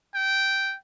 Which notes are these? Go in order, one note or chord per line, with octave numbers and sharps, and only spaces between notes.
G5